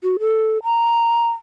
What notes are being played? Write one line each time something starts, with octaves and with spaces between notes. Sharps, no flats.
F#4
A4
A#5